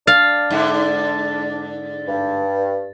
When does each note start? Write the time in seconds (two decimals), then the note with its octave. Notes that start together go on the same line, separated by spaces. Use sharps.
0.07 D4 F5 A6
0.50 G#2 D3
2.08 G2